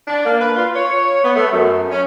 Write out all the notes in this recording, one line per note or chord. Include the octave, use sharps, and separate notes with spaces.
D4
A#3
B4
F4
C#5
B3
A3
F#2
C#4